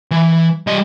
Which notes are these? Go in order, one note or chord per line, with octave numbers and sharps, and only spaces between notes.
E3
G3 D#5